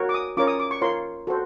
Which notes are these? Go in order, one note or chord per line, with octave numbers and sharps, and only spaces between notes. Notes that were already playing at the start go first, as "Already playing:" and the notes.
Already playing: F#4 A#4 C#5
D6
D#6
C#4 F4 A#4 C#5 D6
D#6
D6
C#6
F4 A#4 C#5 C6
F#4 A4 C5